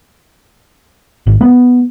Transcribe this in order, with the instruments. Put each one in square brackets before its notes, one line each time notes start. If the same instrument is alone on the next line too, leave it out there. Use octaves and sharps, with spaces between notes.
[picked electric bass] G#1
B3